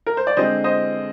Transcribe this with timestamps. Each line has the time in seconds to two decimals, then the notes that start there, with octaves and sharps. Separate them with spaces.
0.07 A#4
0.17 C5
0.27 D5
0.37 D3 G#3 C4 C5 D#5
0.64 C5 D#5